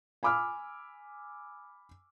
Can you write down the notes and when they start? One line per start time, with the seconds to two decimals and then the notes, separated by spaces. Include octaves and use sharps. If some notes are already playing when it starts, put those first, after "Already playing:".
0.23 G#5 B5 D6 E6 F6